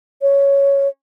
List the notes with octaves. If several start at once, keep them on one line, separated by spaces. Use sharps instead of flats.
C#5